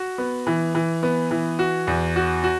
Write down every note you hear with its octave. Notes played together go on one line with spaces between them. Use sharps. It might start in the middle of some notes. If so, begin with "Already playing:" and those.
Already playing: F#4
B3
E3
E3
B3
E3
F#4
E2
F#4
F#4